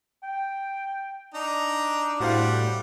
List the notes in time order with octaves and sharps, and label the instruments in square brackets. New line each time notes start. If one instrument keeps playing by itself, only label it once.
[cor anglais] G5
[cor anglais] D4 [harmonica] D#4 A#5
[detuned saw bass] A2 [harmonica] G3 F#5 [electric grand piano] F#4 C5 F5